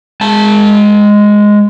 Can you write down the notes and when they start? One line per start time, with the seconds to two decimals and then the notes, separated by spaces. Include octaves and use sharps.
0.21 G#3 A5